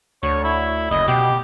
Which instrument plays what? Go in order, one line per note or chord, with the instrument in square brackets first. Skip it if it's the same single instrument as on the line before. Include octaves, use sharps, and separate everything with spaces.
[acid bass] D2 [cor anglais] C#5
[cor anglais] E4
[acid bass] F#1 [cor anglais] D#5
[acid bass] B2 [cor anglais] G4